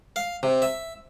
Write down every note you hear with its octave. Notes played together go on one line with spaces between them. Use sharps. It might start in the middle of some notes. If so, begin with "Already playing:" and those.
F5
C3
E5